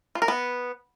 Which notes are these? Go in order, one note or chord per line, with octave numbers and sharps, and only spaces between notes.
F4
A#4
B3